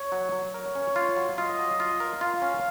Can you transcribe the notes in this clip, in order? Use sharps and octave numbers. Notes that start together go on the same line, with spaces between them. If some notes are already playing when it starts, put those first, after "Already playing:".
Already playing: C#5
F#3
F#3
A#4 C#5
C#4
F4
F#3
F4 D#5
F#3
F4
A#4
F4 F5
C#4